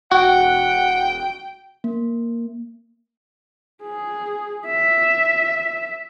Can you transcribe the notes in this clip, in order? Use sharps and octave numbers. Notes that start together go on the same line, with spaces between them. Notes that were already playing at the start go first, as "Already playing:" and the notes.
E1 F#4 F#5 G5
A#3
G#4
E5